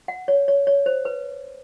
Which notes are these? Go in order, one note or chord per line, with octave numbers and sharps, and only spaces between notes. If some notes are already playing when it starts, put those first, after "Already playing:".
F#5
C#5
C#5
C#5
C5
B4